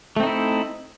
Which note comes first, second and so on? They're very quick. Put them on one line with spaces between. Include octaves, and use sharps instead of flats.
A3 C4 D#4 E4